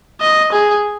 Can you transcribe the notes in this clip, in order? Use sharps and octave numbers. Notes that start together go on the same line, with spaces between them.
D#5
G#4